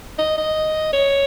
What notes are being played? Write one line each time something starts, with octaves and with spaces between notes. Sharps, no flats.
D#5
D#5
C#5